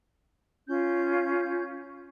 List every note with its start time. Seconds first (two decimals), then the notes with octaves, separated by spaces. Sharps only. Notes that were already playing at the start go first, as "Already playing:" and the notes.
0.68 C#4 F4 G6